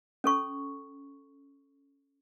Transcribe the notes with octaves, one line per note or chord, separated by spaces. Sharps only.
C#4 A4 C#6